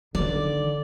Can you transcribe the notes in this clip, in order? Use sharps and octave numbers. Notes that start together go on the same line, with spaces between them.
D3 D#3 D5